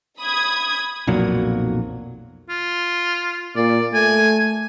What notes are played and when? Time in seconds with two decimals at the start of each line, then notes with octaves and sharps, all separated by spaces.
0.20 B5 D#6 G#6
1.07 B1 F2 A#2 F#3
2.49 F4
3.56 A#2 D5
3.94 A3 G#5